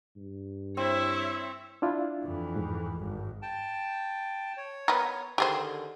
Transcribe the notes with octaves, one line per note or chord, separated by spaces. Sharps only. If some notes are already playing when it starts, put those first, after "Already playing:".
G2
C4 E4 C#5 E5
D4 E4 F4
F2 E3
G#2
G#1 G2
G5 A5
C#5
B3 A#4
D3 D#3 G4 G#4 C5